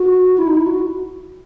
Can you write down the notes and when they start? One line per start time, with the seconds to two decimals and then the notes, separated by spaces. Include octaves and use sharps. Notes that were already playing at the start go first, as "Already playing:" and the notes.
Already playing: F#4
0.38 E4
0.47 D#4
0.57 E4
0.67 F#4